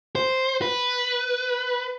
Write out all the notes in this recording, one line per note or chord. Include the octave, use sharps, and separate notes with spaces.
C5
B4